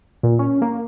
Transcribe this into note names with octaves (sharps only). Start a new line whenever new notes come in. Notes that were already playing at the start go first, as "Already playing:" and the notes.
A#2
C#4
A#3